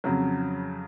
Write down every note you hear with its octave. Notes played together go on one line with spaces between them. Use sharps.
F2 C#3 F#3